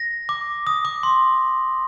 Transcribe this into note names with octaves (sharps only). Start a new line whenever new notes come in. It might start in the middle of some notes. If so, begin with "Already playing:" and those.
Already playing: A#6
D6
D#6
D6
C6